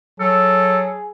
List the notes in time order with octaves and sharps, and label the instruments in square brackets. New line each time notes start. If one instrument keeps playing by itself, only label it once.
[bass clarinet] F#3 [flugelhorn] G#4 [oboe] A4